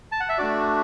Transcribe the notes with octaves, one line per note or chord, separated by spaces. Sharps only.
A5
F#5
E5
A3 D4 F#4 D5